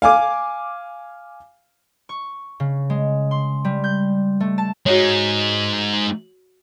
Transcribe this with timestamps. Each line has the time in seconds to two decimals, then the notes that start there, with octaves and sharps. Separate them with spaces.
0.02 F5 G#5 D6
2.09 C#6
2.60 C#3
2.90 G#3
3.31 C6
3.65 G3
3.84 G6
4.40 A3
4.58 A5
4.86 G#3 D#4 F#4 C#5